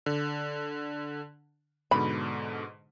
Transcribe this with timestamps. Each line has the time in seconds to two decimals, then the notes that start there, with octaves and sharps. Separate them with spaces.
0.06 D3
1.91 G#2 B2 D3 B5